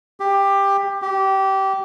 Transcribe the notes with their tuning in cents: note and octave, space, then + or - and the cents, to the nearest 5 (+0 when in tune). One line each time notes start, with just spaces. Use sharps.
G4 +15
G4 -20